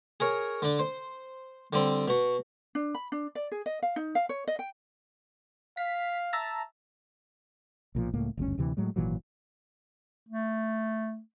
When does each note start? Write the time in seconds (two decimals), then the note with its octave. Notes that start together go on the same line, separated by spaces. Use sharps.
0.20 G#4 A#4 C#5
0.62 D3 D4
0.79 C5
1.73 D3 G3 C4
2.08 B2 F#4
2.75 D4
2.95 B5
3.12 D4
3.35 D5
3.52 G#4
3.66 D#5
3.83 F5
3.96 D#4
4.15 F5
4.29 C#5
4.48 D#5
4.59 G5
5.77 F5 B6
6.33 E5 A5 A#5
7.95 B1 A#2 F3
8.14 C#2 A2 A#3
8.37 F#1 D2 G2 C#4
8.58 D2 C3 E3
8.77 A2 F#3 G#3
8.96 G#1 A#2 E3 F#3
10.29 A3